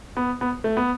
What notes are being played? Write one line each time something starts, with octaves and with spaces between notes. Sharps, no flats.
B3
B3
A3
B3